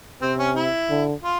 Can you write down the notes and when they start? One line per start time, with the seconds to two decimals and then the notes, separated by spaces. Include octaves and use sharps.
0.22 C3 C4
0.39 C#4
0.56 E4
0.90 D3
1.24 F4